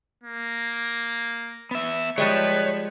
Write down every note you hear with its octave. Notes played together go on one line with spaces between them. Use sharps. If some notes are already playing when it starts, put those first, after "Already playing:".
A#3
B3 E5
F3 G3 G#3 B4 C#5